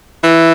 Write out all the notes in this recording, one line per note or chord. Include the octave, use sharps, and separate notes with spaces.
E3